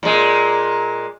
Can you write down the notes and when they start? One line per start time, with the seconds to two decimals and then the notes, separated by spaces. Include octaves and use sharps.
0.03 A#2 G#3